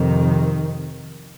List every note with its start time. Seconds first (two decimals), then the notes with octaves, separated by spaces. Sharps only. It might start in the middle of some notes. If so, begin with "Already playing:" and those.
Already playing: F2 C3 D#3